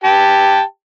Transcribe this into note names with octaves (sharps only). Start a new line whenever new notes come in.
G4 G5 A5